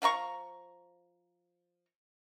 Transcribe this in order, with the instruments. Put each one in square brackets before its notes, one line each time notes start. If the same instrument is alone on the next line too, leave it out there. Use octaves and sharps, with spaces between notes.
[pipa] F3 F5 A#5 C#6